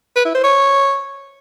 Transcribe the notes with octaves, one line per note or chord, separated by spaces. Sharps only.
B4
E4
C5
C#5